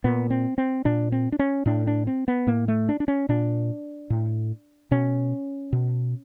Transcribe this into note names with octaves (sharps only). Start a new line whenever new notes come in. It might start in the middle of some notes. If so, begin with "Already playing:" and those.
A#2 B3
C4
C4
A#2 D4
C4
D4
C#4
A2 D4
D4
C4
B3
A2 A#3
A3
D4
D4
C#4
A#2 D4
A2
B2 C#4
B2